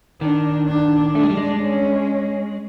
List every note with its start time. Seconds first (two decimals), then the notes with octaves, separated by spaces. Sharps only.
0.21 D#3 D4
0.68 D4
1.15 A3 D4
1.23 G#3
1.30 G3
1.37 G#3
1.63 C#4